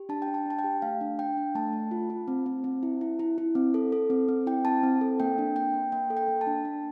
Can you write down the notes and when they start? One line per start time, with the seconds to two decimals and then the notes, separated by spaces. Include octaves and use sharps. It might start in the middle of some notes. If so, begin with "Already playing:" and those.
Already playing: G4
0.09 D4 A5
0.22 G5
0.28 D4
0.34 A5
0.46 D4 A5
0.59 G5
0.64 G4
0.82 A3 F5
1.01 D4
1.19 D4 G5
1.37 D4
1.55 A3 A5
1.73 A3
1.91 F4
2.10 F4
2.28 C4
2.46 C4
2.64 C4
2.83 E4
3.01 E4
3.19 E4
3.38 E4
3.55 C4
3.74 A4
3.92 A4
4.10 C4
4.28 C4
4.47 E4 G5
4.65 C4 A5
4.83 C4
5.01 A4
5.20 A#3 G5
5.38 D4
5.55 A#3 G5
5.74 A#3
5.92 A#3 G5
6.10 A4
6.17 G5
6.28 A#3
6.41 A5
6.47 D4
6.65 D4